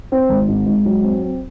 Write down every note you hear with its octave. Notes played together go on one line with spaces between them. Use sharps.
C4
G#1
G#2
G#2
F#3
C4
C4